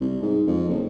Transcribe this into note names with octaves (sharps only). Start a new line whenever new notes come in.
C2
G#2
F2
F#1